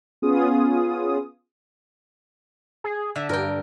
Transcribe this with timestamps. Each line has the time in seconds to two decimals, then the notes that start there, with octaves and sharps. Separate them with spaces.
0.22 B3 C#4 F4 G#4 D#6
2.84 G#4
3.16 D3 E5
3.29 G2 A#4 G5